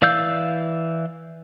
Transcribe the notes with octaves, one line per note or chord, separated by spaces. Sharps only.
E3 D5 F5 E6 G6